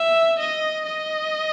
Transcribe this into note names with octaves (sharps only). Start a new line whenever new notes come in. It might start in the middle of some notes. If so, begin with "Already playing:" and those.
Already playing: E5
D#5
D#5